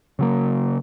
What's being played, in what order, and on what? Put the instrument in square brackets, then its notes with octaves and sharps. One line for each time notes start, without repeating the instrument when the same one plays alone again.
[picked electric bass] C#3 F#3 A#3